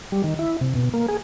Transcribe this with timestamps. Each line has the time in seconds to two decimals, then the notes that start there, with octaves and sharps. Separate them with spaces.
0.12 G3
0.24 D#3
0.39 E4
0.61 C3
0.75 B2
0.94 A#3
1.08 G#4